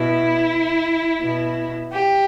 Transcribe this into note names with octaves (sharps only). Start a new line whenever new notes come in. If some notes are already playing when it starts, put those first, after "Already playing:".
Already playing: B2 E4
B2
G4